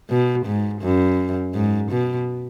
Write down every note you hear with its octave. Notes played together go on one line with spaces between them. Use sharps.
B2
G#2
F#2
G#2
B2